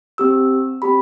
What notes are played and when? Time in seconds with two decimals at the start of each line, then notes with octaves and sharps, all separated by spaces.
0.18 C4 G4 E6
0.82 C4 G4 B5